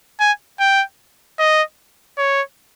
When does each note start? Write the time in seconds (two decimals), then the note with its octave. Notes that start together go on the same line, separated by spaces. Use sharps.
0.20 G#5
0.59 G5
1.39 D#5
2.18 C#5